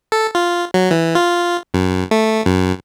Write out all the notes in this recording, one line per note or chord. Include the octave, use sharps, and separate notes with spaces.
A4
F4
F#3
E3
F4
F#2
A3
F#2